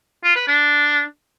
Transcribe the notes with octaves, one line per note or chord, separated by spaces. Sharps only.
F4
B4
D4